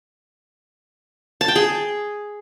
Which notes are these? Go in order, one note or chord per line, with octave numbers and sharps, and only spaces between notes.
A5
G5
G#4